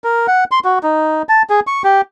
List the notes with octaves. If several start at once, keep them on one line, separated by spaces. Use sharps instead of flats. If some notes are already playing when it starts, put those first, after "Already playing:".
A#4
F#5
C6
F#4
D#4
A5
G#4
C#6
G4